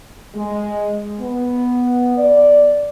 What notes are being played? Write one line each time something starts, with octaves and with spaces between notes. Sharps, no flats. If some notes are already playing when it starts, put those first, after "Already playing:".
G#3
B3
D5